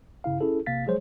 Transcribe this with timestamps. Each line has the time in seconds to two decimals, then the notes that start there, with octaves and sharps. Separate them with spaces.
0.24 G2 C#3 E4 F5
0.41 C#4 E4 G#4 A4
0.66 A#1 C3 A#3 F5 A6 B6
0.85 F3 F#3 G#3 G#4 C5 C#5